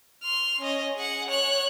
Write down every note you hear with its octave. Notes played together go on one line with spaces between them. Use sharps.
C6 F6
C#4 D#5
G#4 F#5
C#5 F#6